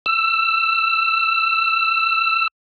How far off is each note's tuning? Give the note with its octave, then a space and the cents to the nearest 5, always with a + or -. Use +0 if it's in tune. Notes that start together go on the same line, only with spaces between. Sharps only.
E6 +20